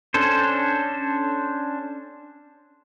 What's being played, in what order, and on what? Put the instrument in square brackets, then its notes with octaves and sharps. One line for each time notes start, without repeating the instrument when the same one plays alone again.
[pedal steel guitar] C#4 D4 A4 C5